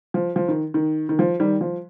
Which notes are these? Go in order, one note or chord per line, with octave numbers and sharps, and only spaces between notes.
F3
F3
D#3
D#3
D#3
F3
D#3 G3
F3